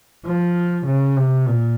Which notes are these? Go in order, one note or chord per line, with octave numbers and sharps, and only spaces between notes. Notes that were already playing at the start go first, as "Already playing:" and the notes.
F3
C#3
C3
A#2